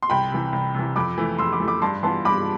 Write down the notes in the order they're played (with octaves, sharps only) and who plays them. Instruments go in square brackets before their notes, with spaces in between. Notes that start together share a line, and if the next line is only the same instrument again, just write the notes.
[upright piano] C6
[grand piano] C2 [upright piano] G5 B5
[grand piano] C3 E3
C2
C3 E3
[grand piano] F2 [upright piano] B5 D6
[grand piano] E3 A3
[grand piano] F2 [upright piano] C6 E6
[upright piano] B5 D6
[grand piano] E3 A3
[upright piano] B5 D6
[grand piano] G2 [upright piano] A5 C6
[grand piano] E3 B3 F4 [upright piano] A5 C6
[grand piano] G2 [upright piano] B5 D6